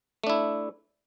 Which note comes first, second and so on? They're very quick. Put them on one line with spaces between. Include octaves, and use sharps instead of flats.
A3 D4 E4